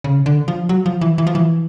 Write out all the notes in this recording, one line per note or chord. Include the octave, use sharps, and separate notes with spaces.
C#3
D3
F3
F#3
F3
E3
E3
F3
E3